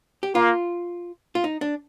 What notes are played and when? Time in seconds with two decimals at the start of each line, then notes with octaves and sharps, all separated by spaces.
0.23 G4
0.35 A#3 F4
1.35 F4
1.44 D#4
1.61 D4